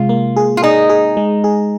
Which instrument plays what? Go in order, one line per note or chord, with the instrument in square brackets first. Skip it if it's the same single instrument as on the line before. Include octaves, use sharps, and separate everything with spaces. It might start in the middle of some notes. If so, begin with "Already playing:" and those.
Already playing: [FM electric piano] C3 G#3 [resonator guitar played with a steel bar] F4
[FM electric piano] A#3
G#4
[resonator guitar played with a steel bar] F4
[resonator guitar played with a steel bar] D#4 [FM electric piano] G#4
[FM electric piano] G#4
G#3
G#4